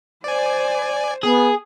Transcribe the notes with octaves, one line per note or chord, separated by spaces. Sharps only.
C5 D5 G#5
B3 G#4